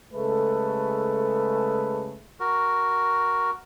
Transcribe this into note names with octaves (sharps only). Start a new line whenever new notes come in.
C#3 G#3 A3 A4 B4
F#4 A#4